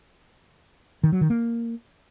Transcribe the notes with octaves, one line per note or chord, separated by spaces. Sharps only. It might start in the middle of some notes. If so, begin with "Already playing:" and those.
D#3
F#3
D#3
A#3